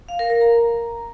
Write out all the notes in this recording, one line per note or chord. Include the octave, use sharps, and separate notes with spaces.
F5
A#4
A#4
A#5